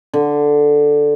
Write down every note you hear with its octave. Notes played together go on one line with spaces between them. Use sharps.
D3